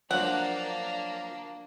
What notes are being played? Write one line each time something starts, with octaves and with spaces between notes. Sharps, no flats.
F3 F#3 A#3 D4 F#5